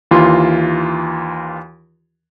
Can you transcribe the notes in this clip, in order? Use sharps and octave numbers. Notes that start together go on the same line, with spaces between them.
D#2 E3 F4 C6